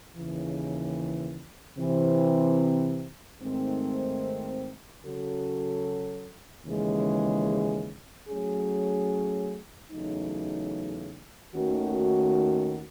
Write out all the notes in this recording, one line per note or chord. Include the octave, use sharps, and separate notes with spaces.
D#2 C#3 E3
C3 E3 C4
G#2 D#3 A3 C4
C#3 F#3 C#4 F#4 A4
D#2 C#3 E3 G#3
F#3 A3 C#4 G#4
E2 C#3 F#3 A3 D#4
D#2 D#3 A3 C#4 F#4